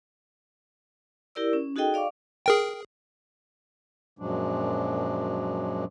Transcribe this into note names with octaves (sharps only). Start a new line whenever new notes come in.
E4 G4 A#4 D5 E6
C#4
D#4 F#4 G#4 A4 D#5 G5
D5 F5 C#6 D6
G#4 A#4 G5
F#2 A#2 F3 F#3 G#3 D4